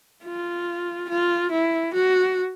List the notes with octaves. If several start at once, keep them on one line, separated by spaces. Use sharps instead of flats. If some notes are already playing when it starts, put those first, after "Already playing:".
F4
F4
E4
F#4